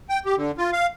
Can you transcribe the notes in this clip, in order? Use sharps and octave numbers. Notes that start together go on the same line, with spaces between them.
G5
G4
D3
F4
F5